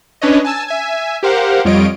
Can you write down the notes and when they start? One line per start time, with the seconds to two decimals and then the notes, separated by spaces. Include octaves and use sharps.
0.22 C#4 D4 B4 C#5 D#5
0.44 G#5 A5 E6
0.68 E5 G#5
1.23 G4 A#4 C5 F5 F#5
1.65 F2 G3 F4 C#5 D#5 D7